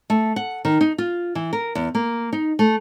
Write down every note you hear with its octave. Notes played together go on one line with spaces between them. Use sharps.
A3
F#5
D#3
D#4
F4
E3
A#4
E2
A#3
D#4
A3